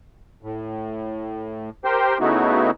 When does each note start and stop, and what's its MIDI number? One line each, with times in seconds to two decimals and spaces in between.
0.43 1.70 45
1.85 2.18 67
1.85 2.18 70
1.85 2.18 72
1.85 2.18 79
1.85 2.18 84
2.20 2.71 49
2.20 2.71 57
2.20 2.71 59
2.20 2.71 63
2.20 2.71 64
2.20 2.71 66